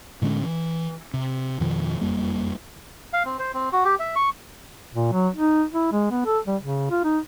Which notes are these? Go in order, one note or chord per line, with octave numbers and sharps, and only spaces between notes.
A2 D3 G#3 C#4
E3
C3
F2 B2 D#3 F3
F#1 F2 G3 A#3
F5
C4
C5
C4
F#4
G4
E5
C#6
A#2
F#3
D#4
E4
G#3
B3
A4
G3
C#3
F4
D#4